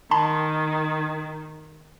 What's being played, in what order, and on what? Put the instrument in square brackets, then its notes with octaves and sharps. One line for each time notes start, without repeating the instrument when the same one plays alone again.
[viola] D#3 [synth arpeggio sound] A5 B5 C6